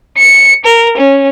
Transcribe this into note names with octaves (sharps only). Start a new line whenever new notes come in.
C#7
A#4
C#4